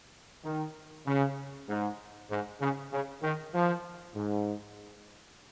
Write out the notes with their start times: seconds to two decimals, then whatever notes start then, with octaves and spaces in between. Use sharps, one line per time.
0.44 D#3
1.06 C#3
1.68 G#2
2.30 G#2
2.61 C#3
2.92 C#3
3.23 D#3
3.54 F3
4.16 G#2